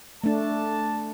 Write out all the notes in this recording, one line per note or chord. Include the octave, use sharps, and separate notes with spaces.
A3 D4 A5